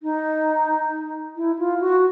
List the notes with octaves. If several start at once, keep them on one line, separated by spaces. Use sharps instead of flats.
D#4
E4
F4
F#4